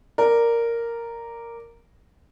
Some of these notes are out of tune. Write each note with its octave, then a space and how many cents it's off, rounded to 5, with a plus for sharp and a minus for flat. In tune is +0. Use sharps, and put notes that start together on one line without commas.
A#4 -5 D5 +0